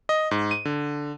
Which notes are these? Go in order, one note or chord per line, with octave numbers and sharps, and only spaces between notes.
D#5
G#2
D#7
D3